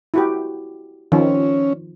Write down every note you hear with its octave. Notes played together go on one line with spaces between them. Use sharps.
E4 F#4 G4
D#3 F3 C#4